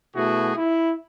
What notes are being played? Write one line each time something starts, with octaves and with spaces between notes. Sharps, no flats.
B2 A3 E4 F#4 G#4
E4